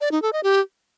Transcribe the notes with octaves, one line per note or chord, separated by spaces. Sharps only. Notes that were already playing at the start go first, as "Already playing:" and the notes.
D5
D#4
A4
D#5
G4